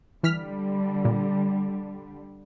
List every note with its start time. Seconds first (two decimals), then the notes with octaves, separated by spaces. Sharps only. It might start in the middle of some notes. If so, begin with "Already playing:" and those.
0.23 D3 E3 G3 F6 B6
1.05 A#2